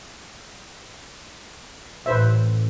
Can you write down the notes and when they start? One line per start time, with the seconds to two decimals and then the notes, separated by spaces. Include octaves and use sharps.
2.06 A1 B4 C5 E5